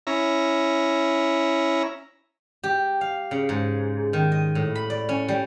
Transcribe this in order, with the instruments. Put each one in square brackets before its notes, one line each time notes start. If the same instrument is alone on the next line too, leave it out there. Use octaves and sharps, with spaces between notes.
[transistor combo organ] C#4 E4 A#5
[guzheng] G4
F5
C#3
G#2
D#3
D#5
A2
B5
D5
C#4
G3